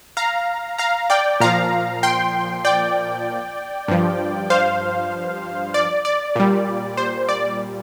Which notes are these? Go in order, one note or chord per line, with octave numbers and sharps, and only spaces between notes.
F5 A#5
F5 A#5
D5 G5
A#2 F3 F5 A#5
G5 C6
D5 G5
G2 F3
C5 F5
D5
D5
A#2 G3
C5
D5